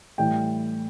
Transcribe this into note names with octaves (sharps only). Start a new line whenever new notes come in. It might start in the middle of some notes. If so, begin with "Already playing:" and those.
A2 E3 G3 G5